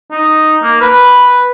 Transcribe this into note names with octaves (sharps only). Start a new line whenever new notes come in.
D#4
A#3
B4